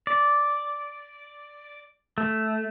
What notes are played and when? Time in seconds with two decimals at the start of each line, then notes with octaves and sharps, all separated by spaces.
0.07 D5
2.18 A3